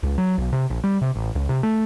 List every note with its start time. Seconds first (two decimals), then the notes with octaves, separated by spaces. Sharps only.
0.03 C#2
0.18 F#3
0.38 B1
0.52 C3
0.70 A#1
0.84 G3
1.02 C3
1.15 A1
1.35 C#2
1.49 C3
1.63 A3